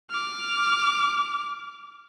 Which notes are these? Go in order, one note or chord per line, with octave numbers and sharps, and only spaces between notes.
D6 F6